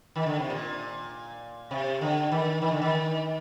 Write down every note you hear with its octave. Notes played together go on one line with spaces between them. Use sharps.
D#3
D3
C3
A#2
C3
D3
D#3
D#3
D3
D#3